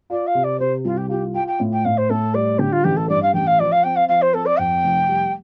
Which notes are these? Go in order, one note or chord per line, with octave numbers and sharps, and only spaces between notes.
F4 D5
F5
C3
D5
C3 C5
C2 F4
G4
F4 G4
F4 G5
G5
A2
G5
A2 F5
C5
A2 A4
G3 D5
D3 G4
F4
A1 G4
A4
G2 D5
F5
A1 G5
F5
F3 D5
F5
C4 G5
F5
F3 F5
C5
C4 A4
D5
F2 G5
F1
G3